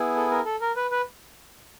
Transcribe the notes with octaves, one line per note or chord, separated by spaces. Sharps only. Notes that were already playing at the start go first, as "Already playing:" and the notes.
Already playing: B3 E4 G#4
A4
A#4
A4
A#4
B4
B4